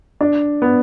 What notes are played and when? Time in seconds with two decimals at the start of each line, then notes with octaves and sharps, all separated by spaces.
0.21 D4
0.62 B3